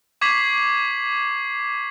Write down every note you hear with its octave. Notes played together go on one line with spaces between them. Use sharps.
C#6 D6 G#6 B6 C7 F#7